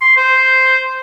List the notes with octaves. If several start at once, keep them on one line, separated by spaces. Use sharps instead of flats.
C6
C5